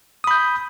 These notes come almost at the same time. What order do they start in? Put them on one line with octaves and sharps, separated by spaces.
D#6 B5 G6